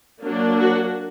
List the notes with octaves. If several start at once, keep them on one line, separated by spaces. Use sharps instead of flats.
F#3 A#3 D4
F#4